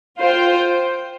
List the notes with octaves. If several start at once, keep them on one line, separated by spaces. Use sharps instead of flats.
F4 C5 G5